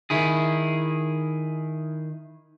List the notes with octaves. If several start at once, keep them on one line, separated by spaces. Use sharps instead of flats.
D#3 E4 G#4